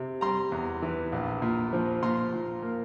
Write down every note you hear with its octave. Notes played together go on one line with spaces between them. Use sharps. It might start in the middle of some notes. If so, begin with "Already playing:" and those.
Already playing: C3
G3 A#5 C6
E2
E3
A#1
A#2
F3
A#2 A#5 C6
A#2
A#3